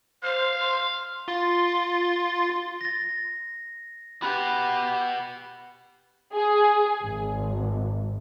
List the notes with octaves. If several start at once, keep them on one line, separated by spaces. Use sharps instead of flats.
C5 F5
C6
F4 C6 A6
A6 A#6
F#4 G4 B4 B5 F#6
G#4
G#1